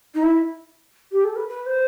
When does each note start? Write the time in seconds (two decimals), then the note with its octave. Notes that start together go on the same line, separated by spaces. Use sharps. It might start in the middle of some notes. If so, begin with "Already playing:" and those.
0.15 D#4
0.23 E4
1.12 G4
1.24 A4
1.36 B4
1.48 B4
1.66 C5